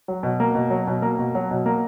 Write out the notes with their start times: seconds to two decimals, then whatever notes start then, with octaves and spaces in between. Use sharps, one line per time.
0.08 F#3
0.23 B2
0.40 A#3
0.55 B2
0.70 F#3
0.87 B2
1.02 A#3
1.19 B2
1.35 F#3
1.51 B2
1.66 A#3